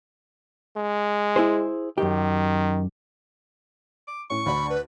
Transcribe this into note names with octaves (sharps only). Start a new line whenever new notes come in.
G#3
E4 G#4 C5
F#2 D#3 G4
D6
A2 C#4 C#6
D2 D4 B5
B4